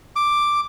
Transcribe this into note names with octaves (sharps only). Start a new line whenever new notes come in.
D6